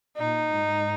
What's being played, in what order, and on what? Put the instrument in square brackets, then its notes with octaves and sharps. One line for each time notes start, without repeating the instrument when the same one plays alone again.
[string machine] A#2 [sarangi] D#4
[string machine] G#2